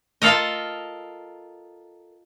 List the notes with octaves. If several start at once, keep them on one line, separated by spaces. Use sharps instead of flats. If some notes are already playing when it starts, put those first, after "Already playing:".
F4 A4 A#4 D#5